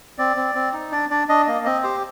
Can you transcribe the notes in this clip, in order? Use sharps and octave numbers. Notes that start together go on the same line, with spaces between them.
C4 D5
C4
C4
D#4
D4 D5
D4 D5
D4 D#5
A#3 D#5
C4 D#5
G4 C5